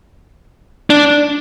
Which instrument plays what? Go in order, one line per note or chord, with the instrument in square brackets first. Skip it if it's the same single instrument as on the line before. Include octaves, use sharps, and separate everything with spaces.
[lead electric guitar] D4